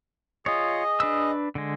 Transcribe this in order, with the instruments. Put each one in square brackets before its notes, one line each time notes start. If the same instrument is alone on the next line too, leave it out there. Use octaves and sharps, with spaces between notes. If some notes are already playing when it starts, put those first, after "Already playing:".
[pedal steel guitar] F4 C#5 [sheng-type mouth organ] G#4 D#5
[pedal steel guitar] D4 B4 E6
D3 G#3